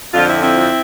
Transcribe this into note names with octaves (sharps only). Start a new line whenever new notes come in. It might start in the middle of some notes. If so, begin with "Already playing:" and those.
F2 D3 F3 D4 F4
C4 E4
C4 E4